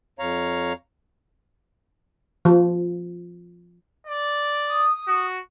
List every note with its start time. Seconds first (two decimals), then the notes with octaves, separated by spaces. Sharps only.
0.19 F2 C#5 F5 A#5
2.45 F3
4.07 D5
4.65 D#6
5.08 F#4